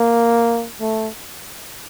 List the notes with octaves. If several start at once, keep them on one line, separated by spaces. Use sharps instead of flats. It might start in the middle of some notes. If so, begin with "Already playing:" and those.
Already playing: A#3
A3